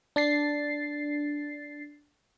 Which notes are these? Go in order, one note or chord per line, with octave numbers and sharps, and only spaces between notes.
D4 A6 C7